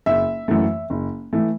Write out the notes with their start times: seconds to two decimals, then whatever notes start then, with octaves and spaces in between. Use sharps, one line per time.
0.06 F#1 E5
0.48 F#2 E3 A3
0.90 F#1
1.33 E3 A3